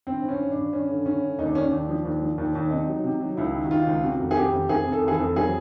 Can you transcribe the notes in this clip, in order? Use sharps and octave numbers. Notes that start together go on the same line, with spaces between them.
G2 C4
G2
C#4
G2
G2 D4
G2 C#4
D3
G2 C#4
D3
D#2 D#4
D4
D#2 C#4
D4
D#2
F3
D#2
F3
D#2
D#2
C3 D#4
F#3
C3
F#3
C#2 E4
D#3
F#4
D#3 F4
C#2
C3 F#4
F2
G#4
F2 G4
F2
F2 G#4
C3
A4
E3
G#4
A4
F2
F#3 G#4